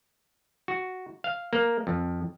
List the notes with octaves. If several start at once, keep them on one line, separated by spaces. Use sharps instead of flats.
F#4
F5
A#3
F2